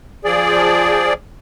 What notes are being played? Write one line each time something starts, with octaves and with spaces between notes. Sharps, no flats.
F3 G#4 D5